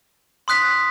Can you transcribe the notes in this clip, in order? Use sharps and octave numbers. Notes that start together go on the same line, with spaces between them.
C6 D#6 F#6 B6